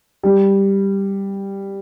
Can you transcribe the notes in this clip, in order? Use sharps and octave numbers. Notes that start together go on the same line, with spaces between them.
G3